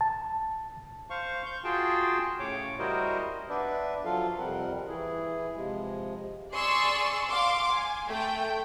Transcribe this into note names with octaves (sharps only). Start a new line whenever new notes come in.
A5
C5 F5 C#6
G6
F4 F#4 G#4 G5 A5 C6
A2 C#3 C#5 D6
G3 E4 F#4 A#4 C5 D#5
B3 D4 B4 D5 E5
F3 F#3 F4 A4 F5
F2 C3 G3 C4 A#4 F#5
E3 E4 G#4
C3 F3 G#3
G#4 D5 C6 C#6 E6
F5 C6 D6
G#5
A3 G5